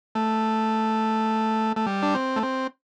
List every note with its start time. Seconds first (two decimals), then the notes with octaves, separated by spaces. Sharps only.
0.15 A3
1.76 A3
1.86 G3
2.03 D4
2.15 C4
2.36 A3
2.43 C4